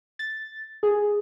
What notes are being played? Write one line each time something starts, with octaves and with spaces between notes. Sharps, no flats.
A6
G#4